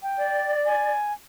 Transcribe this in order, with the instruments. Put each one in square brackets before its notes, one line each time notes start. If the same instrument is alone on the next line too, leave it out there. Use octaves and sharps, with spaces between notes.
[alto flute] G5
[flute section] D5
[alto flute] G#5